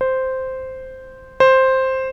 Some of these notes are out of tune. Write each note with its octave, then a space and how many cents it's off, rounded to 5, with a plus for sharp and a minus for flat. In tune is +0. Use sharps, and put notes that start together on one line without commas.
C5 -5
C5 +5